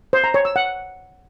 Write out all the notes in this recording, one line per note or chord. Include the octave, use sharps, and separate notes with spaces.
C5
A#5
C#5
E6
F#5